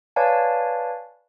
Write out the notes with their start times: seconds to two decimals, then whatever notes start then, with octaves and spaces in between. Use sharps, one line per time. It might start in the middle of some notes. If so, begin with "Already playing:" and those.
0.16 B4 C#5 D5 F5 G#5 A5